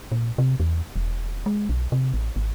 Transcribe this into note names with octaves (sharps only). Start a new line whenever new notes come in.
A#2
C3
E2
E1
G#3
B1
C3
A1
G#1